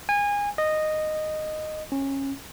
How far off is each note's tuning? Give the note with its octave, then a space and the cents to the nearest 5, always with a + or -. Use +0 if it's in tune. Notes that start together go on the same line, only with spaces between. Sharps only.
G#5 -25
D#5 -10
C#4 -20